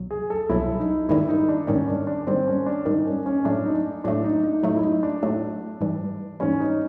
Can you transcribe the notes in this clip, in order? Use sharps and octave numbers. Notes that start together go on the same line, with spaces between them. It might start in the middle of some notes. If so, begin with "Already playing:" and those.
Already playing: C2 B2 F#3
G#4
A4
C2 B2 F#3 E4
D#4
G#2 D#3 G3 E4
D#4
D4
G#2 D#3 G3 C#4
D4
D4
G#2 D#3 G3 C4
C#4
D4
G#2 D#3 G3 D#4
C#4
C#4
A2 F#3 A3 D4
D#4
D4
A2 F#3 A3 D4
D#4
D#4
A2 F#3 A3 D#4
E4
D#4
D4
A2 F#3 A3
G#2 E3 G3
G#2 E3 G3 C#4
D#4